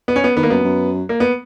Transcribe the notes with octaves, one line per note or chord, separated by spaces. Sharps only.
B3
C#4
B3
D#3 B3
A#3
F#2 B3
F#2
A#3
B3